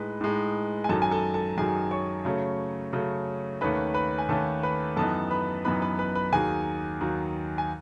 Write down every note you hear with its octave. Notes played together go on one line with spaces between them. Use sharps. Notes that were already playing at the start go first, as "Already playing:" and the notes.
Already playing: A2 G#3 D#4 B4
A2 G#3 D#4
G#5
F#2 D#3 F#3 A4 A5
G#5
A4 A5
A4 A5
F#2 D#3 F#3 G#4 G#5
C#5 C#6
C#3 F#3 A3 C#4
C#3 F#3 A3 C#4
D#2 D#3 A3 C#4 B4 B5
B4 B5
G#5
D#2 D#3 A3 C#4 A4 A5
B4 B5
F#2 E3 B3 D#4 A4 A5
B4 B5
F#2 E3 B3 D#4 B4 B5
B4 B5
B4 B5
B4 B5
D#2 D#3 F#3 G#4 G#5
D#2 D#3 F#3
G#5